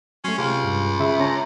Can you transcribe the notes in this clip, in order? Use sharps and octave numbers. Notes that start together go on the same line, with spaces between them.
F#3 A3 C#4 C6
C#2 C3 G4 F5 F6
G2
C#3 G#4 E5 B5
C#4 A5 A#5